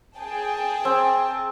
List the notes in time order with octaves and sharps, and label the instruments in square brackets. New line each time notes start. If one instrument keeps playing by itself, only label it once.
[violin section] G#4 G5 A5
[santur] C4